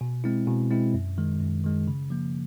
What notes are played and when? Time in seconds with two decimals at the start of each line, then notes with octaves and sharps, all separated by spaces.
0.01 B2
0.24 G#3 C4 E4
0.47 B2
0.70 G#3 C4 E4
0.94 F#2
1.18 D#3 G#3
1.41 F#2
1.64 D#3 G#3
1.88 C#3
2.10 F3 A#3